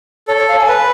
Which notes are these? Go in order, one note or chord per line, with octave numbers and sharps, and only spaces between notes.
A4 C#5
C#5
F5
G#5
B4